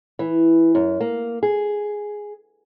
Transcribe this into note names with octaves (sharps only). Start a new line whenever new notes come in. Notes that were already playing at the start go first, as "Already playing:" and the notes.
E3
F#2
A#3
G#4